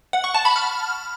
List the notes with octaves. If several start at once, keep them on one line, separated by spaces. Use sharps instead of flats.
F#5
C#6
A5
B5
F6